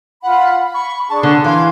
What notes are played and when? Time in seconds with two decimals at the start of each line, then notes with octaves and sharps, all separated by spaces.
0.23 F4 F#5 B5
0.62 B5
0.74 C#6
1.10 D4 G#4 A5 C#6
1.23 D3
1.44 E3 F5 G#5 C6